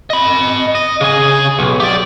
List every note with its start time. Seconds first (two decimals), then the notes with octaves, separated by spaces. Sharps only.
0.10 D#5 B5
0.75 D#5
1.01 C#3 G#4
1.59 B1
1.80 G4 D5